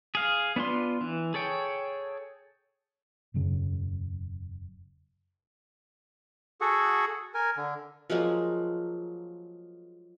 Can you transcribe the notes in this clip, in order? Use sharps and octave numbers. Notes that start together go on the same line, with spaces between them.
G#4 F5
B3 D4 F4 C6
E3
G#4 A4 C#5 G5
E1 F#2 C#3
F#4 G#4 A4 F#5
A#4 G#5
D3
F3 F#3 G#3 A#3